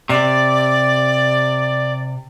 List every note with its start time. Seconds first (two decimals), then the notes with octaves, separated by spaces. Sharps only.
0.09 C3 D5